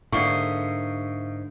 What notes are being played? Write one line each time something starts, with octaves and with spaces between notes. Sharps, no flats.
G#2 D3 A#3 D4 E5 F5 C#6 D#6